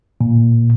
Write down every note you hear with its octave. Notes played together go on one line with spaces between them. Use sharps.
A#2